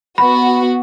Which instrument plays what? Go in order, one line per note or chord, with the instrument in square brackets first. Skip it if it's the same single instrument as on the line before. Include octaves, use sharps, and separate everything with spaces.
[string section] B3 F#4 [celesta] B5